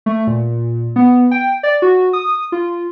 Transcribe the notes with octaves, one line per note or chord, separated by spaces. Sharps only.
A3
A#2
B3
G5
D5
F#4
D#6
F4